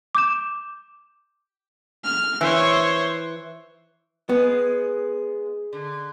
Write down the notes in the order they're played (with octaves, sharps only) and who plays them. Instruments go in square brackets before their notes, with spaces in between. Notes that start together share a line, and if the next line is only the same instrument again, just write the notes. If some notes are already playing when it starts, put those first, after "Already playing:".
[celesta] D6 G6 E7
[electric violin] F6
[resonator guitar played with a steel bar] E3 [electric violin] C5 C#5
[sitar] G#3 [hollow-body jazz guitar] B3
[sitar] D3